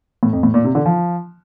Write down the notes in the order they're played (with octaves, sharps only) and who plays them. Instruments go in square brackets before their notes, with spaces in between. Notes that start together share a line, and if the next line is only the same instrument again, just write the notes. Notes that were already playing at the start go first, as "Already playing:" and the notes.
[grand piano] A2
F2
A2
A#2
C3
D3
F3